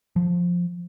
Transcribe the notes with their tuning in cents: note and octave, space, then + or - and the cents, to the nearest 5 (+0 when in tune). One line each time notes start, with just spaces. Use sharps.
F3 +10